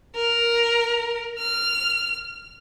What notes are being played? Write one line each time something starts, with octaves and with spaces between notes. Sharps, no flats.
A#4
F6